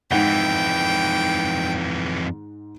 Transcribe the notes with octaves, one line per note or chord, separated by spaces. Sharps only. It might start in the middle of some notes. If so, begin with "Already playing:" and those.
F2 G#2 E3 F#5 G5 G7